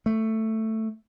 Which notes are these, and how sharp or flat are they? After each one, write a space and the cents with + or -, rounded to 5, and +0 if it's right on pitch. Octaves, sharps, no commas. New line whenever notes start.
A3 +10